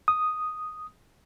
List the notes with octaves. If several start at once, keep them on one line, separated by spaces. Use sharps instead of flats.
D#6